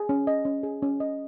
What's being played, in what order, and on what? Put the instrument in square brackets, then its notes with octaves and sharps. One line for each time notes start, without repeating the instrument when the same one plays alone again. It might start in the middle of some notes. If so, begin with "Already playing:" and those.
Already playing: [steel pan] G#4
C#4
D#5
C#4
G#4
C#4
D#5